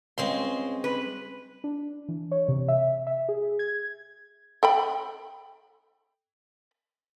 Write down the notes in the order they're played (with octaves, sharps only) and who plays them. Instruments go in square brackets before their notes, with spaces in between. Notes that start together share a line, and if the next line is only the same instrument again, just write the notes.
[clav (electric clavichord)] C#2 [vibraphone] G3 C#4 D#5 [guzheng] G#3 C4 C6
[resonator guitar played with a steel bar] B4
[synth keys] D4
E3
C#5
C3
E5
E5
G#4
G#6
[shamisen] A4 G5 B5